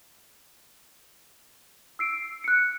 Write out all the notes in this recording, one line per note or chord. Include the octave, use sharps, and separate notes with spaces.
E6 C7 D7
F#6 C#7